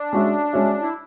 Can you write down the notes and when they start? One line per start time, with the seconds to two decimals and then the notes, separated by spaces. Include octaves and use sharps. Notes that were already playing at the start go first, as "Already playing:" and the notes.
Already playing: D4
0.13 G#3 C#4 F#4 C#5 E5
0.53 G#3 C#4 F#4 C#5 E5
0.82 E4